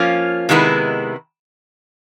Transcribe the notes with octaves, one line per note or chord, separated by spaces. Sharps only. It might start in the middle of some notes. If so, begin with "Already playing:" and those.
Already playing: F3 A#3 C#4 F4
C3 D#3 G#3 B3 E4